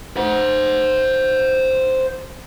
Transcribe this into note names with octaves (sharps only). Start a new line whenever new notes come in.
C5 F#5